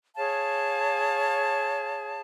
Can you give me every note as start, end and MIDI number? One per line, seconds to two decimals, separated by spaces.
0.16 2.21 68
0.16 2.21 73
0.16 2.21 77
0.16 2.21 81